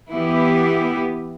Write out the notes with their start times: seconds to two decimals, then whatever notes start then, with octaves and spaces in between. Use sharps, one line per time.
0.11 E3 B3 E4 G4